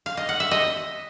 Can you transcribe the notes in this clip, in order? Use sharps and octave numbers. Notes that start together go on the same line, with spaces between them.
F5
D#5
F#5
E5
D#5